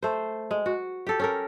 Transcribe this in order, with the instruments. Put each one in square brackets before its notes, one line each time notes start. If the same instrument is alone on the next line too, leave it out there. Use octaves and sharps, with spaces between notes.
[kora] A3 C5
G#3
F#4
G4 A4
C#4 A4 A#4